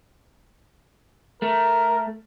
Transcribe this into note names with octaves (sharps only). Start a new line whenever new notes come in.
A3 A#4